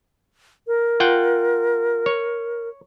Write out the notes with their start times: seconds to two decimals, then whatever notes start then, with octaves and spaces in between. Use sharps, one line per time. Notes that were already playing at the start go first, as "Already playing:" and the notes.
0.67 A#4
1.00 F4 F#5 G5
2.06 C#5